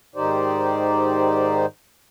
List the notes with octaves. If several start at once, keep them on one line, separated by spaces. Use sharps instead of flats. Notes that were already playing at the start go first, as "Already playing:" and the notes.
G#2 D#3 D#4 G4 C5 D5